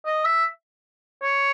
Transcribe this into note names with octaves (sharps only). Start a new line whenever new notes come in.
D#5
E5
C#5